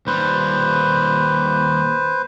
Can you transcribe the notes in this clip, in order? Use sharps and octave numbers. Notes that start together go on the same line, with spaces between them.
D#2 G3 B4 C5